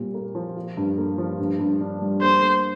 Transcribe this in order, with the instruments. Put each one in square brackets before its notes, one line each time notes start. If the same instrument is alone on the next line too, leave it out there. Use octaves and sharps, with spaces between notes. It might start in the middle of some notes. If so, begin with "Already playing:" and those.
Already playing: [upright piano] A#2 G3 C4 G4
A#3
F3
F4
G2
A#3
F3
G2
G2
D4
G3
[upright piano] A#3 [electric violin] C5
[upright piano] A#3